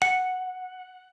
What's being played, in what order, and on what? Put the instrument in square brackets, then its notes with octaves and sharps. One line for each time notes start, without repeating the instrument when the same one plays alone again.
[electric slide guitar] F#5 [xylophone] C#7